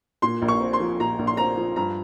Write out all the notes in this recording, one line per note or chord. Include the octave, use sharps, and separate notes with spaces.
A#2 C6
A#1
C#6
C4
C6
F3
A#2 A#5
A#1
C6
C4 A#5
F3
G2 A#5